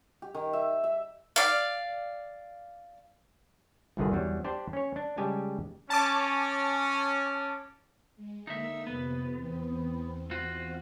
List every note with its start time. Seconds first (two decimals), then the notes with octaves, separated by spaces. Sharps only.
0.22 G4
0.35 D#3
0.53 E5
0.84 E5
1.36 D5 F5
3.97 G1 C2 D3 D#3 G#4
4.12 E2 F#3 G3
4.44 D4 G4 C5 D5
4.73 C#4 C#5
4.96 D4
5.17 C#3 G3 G#3 G4 G#5 A5
5.90 C#4 A5 D6
8.16 G#3
8.47 D3 A#3 D#4 E5 E6
8.87 F2 C3 B3
9.35 E2 C4
10.31 F4 F#4